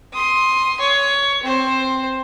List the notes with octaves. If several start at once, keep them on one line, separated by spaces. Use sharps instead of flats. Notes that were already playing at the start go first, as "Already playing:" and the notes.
C6 D#6
C#5
C4 C5